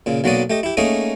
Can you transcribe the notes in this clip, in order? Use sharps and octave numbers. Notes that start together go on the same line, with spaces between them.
A#2 C#3
B1 F#3 A#3 F#4 D5 D#6
A3 G4 D#5
E4 G4
A3 A#3 C#4 D#4 G#4 A#4